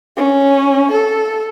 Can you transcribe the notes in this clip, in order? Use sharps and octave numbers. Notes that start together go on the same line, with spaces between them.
C#4
A4